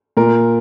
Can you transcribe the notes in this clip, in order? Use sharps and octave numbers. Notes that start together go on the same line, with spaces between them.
A#2 A#4